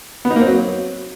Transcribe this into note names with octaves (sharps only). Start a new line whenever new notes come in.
B3
D#4
A#3
C4
F#3